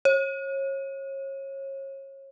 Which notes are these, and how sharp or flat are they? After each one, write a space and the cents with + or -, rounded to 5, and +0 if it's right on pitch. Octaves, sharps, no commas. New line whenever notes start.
C#5 -30